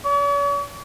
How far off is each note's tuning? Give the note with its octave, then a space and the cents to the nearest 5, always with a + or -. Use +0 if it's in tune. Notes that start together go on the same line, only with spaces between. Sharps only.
C#5 +45